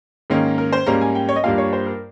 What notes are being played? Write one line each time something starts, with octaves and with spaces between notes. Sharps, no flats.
G#2 D#3 A#3 C#4
A#4
C5
G#2 G3 A#3 C#4 A#5
G#5
G5
C#5
D#5
G2 G3 A#3 F4 F5
C#5
C5
A#4